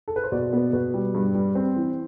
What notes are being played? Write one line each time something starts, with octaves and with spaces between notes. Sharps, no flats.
A4
B4
C5
B2 D5
B3
B2 B4
G3
G2
G3
C4 C5
E3